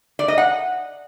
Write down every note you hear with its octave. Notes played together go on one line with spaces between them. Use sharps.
D5
D#5
F#5